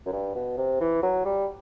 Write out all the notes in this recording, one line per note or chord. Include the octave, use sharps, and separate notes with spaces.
F#2
G2
B2
C3
E3
F#3
G3